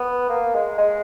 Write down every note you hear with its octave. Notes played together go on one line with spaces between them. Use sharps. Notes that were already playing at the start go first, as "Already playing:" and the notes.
Already playing: B3
A#3
G#3
G#3